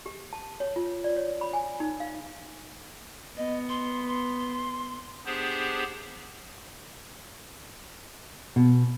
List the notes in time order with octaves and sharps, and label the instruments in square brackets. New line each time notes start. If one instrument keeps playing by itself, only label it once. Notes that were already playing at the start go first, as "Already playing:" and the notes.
[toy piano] G4
A5
C#5
F4
D5
C#5
B5
G#5
D#4
F5
[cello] B3 [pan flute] D#5
[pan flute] C6
C6
[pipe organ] B3 D4 G4 G#4 C5
[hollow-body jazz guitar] B2